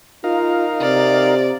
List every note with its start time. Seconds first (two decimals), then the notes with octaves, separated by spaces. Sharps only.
0.24 D#4 F4 A#4 F5
0.81 C3 D5